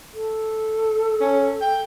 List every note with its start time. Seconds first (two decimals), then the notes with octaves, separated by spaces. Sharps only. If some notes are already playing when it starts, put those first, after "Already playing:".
0.13 A4
1.21 C#4
1.61 G5